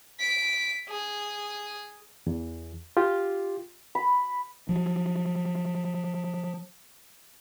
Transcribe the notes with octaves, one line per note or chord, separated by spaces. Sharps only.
B6 D7
G#4
E2
F4 G4
B5
F3 F#3